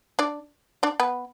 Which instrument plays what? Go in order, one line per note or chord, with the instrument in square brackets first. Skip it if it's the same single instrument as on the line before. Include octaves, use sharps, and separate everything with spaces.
[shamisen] D4 D5
D4 D5
B3 B4